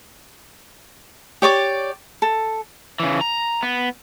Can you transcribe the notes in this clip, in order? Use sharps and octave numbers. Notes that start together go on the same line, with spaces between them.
G4 C#5 D5 D6
A4
C#3 E3
A#5
B3